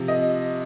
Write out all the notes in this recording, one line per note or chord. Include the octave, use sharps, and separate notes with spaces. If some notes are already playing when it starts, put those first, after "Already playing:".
Already playing: C3 F3
D#5